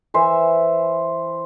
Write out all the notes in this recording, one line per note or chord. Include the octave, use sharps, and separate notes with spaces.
E3 C5 E5